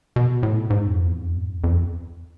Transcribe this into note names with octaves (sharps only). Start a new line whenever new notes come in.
B2
A2
G#2
F2
E2
F2
G#2
F2
F2